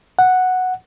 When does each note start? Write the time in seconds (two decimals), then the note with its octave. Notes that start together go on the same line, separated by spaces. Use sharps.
0.19 F#5